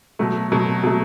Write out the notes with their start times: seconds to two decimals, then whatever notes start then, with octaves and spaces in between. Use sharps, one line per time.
0.19 B2 F#3 A3
0.52 B2 F#3 A3
0.83 B2 F#3 A3